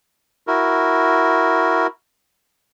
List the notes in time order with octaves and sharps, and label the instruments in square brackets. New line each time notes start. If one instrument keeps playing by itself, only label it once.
[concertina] E4 F#4 A#4